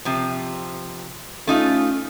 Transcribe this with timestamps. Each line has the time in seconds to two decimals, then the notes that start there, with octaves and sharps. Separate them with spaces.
0.05 C3 F3
1.47 A3 C#4 D#4 F4